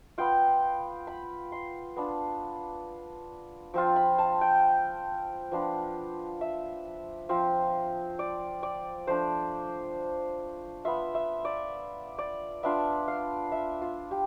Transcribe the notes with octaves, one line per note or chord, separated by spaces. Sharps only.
B3 F4 G5
B5
C6
B3 D4 F4
F3 C4 F4
B5
A5
G5
F3 B3 D4 F4
E5
F3 C4 F4
D5
D5
F3 A3 D4 C5
B3 F4 E5
E5
D5
D5
B3 D4 F4 E5
F5
E5
F4
G4